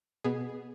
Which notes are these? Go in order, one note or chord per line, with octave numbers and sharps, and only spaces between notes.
B2 B3 G#4